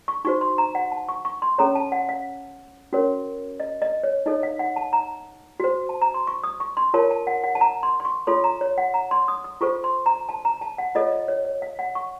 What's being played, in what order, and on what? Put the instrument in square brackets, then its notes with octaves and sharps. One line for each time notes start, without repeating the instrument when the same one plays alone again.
[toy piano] C#6
D#4 F#4 C5 C#6
C6
A#5
F#5
A5
C#6
C#6
C6
C#4 A4 C#5 A#5
A5
F#5
F5
C#4 F#4 A#4 C#5
D#5
D#5
C#5
D#4 A4 C#5 D#5
F5
F#5
A5
A#5
F#4 C5
A5
A#5
C6
C#6
D#6
C#6
C6
F4 A#4 C#5 A5
A5
F#5
F#5
A5
A#5
C6
C6
C#6
F4 A4 C#5 C6
A#5
C#5
F#5
A#5
C6
D#6
D#6
F4 A4 C5 C#6
C6
A#5
A5
A#5
A5
F#5
F4 A4 C#5 D#5
D#5
C#5
C#5
F5
F#5
C#6